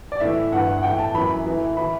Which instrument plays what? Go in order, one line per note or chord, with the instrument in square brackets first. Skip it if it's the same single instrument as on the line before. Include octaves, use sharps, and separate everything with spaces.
[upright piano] D5
A2 E3 E5
G2 E3 F#5
F#5
A2 E3 G5
A5
F#2 E3 B5
A2 E3
E3 B5